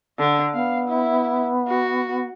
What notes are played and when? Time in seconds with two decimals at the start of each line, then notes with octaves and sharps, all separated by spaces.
0.18 D3
0.54 B3 F5
0.88 E4
1.67 F#4